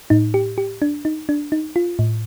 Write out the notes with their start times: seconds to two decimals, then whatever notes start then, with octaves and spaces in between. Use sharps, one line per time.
0.10 A2 D#4
0.34 G4
0.58 G4
0.82 D4
1.05 D#4
1.29 D4
1.52 D#4
1.76 F4
1.99 A2